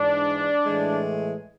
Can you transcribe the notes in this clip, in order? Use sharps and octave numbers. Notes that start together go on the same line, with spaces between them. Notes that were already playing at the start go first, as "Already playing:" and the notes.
Already playing: G#2 E3 G#3 D4
A2 E3 G#3